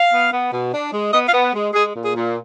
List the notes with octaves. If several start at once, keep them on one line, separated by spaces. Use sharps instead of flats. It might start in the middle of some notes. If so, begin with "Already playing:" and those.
Already playing: F5
B3
B3
B2
D4
G#3
B3 D#5
F5
B3
F#5
G#3
G#3 G#4
A#2
G#4
A#2